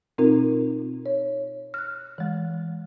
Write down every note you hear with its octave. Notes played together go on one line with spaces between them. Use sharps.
B2 C4 D#4 F4 A#4
C#5
F6 F#6
E3 G#3